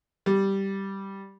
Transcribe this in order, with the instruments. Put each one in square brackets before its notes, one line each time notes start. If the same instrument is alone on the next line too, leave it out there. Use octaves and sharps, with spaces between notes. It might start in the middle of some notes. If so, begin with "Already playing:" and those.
[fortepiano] G3